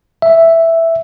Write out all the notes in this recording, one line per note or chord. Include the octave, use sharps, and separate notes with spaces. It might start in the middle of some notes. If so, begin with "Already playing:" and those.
E5